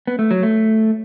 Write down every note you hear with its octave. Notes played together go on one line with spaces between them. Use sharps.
B3
A3
F#3
A3